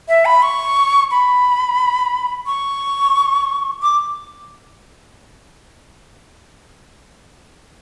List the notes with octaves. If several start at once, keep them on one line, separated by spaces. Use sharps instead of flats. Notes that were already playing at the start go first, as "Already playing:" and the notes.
E5
B5
C#6
B5
C#6
D6